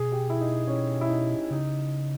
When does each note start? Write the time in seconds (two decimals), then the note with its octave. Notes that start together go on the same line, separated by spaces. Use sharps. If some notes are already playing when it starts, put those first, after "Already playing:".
Already playing: B2 G#4
0.12 G4
0.30 E4
0.40 D#4
0.67 C#4
1.01 E4
1.09 D#4
1.51 C#3 D#4